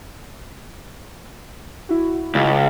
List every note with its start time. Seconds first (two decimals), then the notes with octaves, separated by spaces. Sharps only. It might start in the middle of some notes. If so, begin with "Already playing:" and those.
1.89 E4 F#4
2.35 C#2